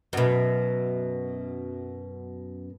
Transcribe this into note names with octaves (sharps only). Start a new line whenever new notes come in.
F#2 B2